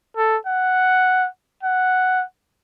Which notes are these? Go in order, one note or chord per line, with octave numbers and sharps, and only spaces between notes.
A4
F#5
F#5